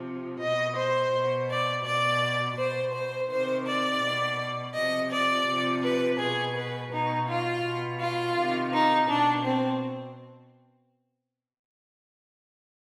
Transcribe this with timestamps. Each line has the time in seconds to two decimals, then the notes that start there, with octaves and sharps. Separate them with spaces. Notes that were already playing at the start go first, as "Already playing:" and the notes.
Already playing: C3 F3
0.41 B2 D#5
0.77 C5
1.14 B2
1.49 D5
1.85 B2 D5
2.58 B2 C5
2.94 C5
3.30 C3 D#3 C5
3.66 D5
4.02 B2
4.75 C3 F3 D#5
5.11 D5
5.47 C3
5.52 F3
5.84 B4
6.19 B2 G#4
6.56 B4
6.92 B2 D#4
7.28 F4
7.64 B2
8.00 F4
8.37 C3 D#3
8.72 D#4
9.08 B2 D4
9.45 C4